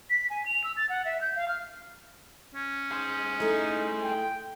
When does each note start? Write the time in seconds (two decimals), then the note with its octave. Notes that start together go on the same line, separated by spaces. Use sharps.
0.10 B6
0.30 G#5
0.46 F7
0.64 E6
0.77 A6
0.89 F#5
1.05 E5
1.21 G6
1.36 F5
1.48 F6
2.55 C#4
2.91 G#4 C5
3.40 A3 D#4 E4
4.02 G5